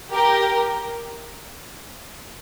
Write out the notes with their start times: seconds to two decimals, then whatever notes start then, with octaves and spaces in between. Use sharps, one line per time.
0.11 G4 A#4